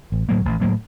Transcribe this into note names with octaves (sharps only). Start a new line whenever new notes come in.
A1
A2 F#3 A#3
A1
A2 F#3 A#3